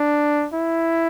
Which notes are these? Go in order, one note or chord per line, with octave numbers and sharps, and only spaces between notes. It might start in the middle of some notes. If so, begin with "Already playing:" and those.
Already playing: D4
E4